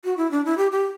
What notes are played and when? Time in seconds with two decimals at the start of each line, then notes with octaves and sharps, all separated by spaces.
0.04 F#4
0.17 E4
0.31 D4
0.45 E4
0.58 G4
0.72 G4